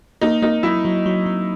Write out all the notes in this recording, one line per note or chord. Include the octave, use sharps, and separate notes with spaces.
A#3 D#4
A#3 D#4
F#3 E4
F#3
F#3
F#3